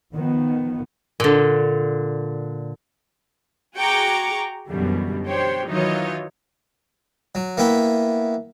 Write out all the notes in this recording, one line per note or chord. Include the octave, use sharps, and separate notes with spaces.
D#3 F3 B3
A#2 D3
F#4 G#4 G5 A#5 C#6 D6
F#2 B2 D3 E3 G3
D4 G4 C5 C#5 G5
D#3 E3 F#3 D#4 F4 C#5
F#3
A#3 B3 E4 G5 B5